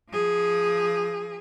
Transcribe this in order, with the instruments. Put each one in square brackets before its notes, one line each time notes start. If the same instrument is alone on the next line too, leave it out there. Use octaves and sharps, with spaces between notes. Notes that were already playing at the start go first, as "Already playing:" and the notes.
[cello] F3 G#4